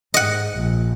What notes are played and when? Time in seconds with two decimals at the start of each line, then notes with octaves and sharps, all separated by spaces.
0.14 G#2 D#5 F#5
0.56 A#1